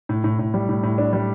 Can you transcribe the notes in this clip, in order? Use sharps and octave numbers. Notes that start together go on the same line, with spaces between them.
A2
A2
A2
G3
A2
A2
D4
G3